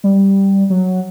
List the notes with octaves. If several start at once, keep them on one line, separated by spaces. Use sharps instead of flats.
G3
F#3